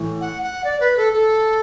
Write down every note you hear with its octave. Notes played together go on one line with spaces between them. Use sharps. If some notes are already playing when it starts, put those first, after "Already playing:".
Already playing: A2 E3
F#5
F#5
D5
B4
A4
A4